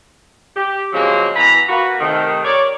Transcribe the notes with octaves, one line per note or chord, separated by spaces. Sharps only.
G4
C#3 F3 F#3 G#3 A#3 C4
B2 E3 B4 A#5
A#3 F#4 B4
C3 D#3 A3
A#4 C#5 D5